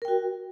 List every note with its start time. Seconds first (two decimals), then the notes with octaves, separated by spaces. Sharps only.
0.02 A#4
0.05 G5
0.08 F#4